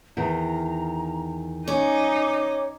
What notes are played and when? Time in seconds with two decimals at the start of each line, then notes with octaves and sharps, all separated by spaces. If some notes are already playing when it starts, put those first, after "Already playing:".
0.17 E2 D#3 A#5
1.68 C#4 D#4 D6